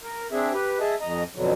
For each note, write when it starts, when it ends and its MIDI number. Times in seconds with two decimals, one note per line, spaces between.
0.03 0.27 70
0.32 0.52 60
0.32 0.52 62
0.32 0.52 68
0.32 0.52 76
0.53 0.78 67
0.53 0.78 71
0.80 0.95 68
0.80 0.95 75
0.80 0.95 76
0.80 0.95 81
1.01 1.23 41
1.01 1.23 75
1.01 1.23 82
1.35 1.53 41
1.35 1.53 47
1.35 1.53 50
1.35 1.53 54